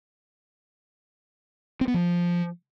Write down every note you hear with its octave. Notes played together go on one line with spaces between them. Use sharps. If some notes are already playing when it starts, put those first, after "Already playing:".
C4
B3
F3